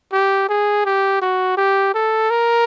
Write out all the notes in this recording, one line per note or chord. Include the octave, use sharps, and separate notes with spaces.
G4
G#4
G4
F#4
G4
A4
A#4